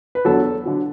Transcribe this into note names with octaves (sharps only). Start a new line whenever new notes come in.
B4
E2 D3 F#3 A4
D3 F#3